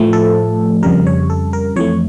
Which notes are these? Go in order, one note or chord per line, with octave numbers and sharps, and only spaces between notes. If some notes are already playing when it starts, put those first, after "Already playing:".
Already playing: A2 F3 A3
A4
F2 C#3 G3 A#4
C#5
A4
A#4
F2 E3 A3 C#5